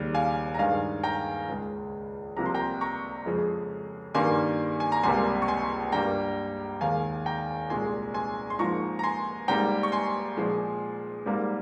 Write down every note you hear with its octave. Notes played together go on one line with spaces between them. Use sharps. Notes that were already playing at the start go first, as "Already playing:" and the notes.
Already playing: D#2 C#3 G3
F5 G#5
A#5
G2 D#3 G#3 F5 G#5
G5 A#5
C#2 C#3 G#3
C2 C3 F3 A#3 A#5
C6
G5 A#5
A#5 C#6
F2 C#3 F3 G#3
G2 D#3 G3 A#3 G#5 C6
G#5
A#5
C#2 C3 G3 A#3 G#5 C6
C#6
G#5 C6
G2 G3 A#3 G5 A#5
D#2 D#3 G#3 F5 G#5
G5 A#5
C2 A#2 G#3 G#5 C6
G#5 C6
C6
G#2 F3 A#3 A#5 C#6
A#5
G#5 C6
G#2 G3 A#3 G5 A#5
C#6
G#5 C6
A#2 F3 G#3
G#2 G3 A#3